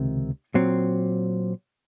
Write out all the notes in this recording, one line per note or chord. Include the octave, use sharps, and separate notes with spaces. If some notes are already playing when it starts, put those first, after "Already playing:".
Already playing: C#2 C3 D#3
A#2 F#3 C4